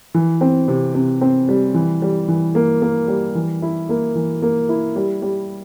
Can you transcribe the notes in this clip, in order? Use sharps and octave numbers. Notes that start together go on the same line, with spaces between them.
E3
C4
C3
C3
C4
G3
E3
G3
E3
A#3
A#3
G3
E3
E4
A#3
E3
A#3
E4
G3
G3